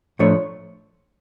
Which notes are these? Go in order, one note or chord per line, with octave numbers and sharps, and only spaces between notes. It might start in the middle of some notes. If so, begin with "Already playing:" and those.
A2 F3 A3 D4 C#5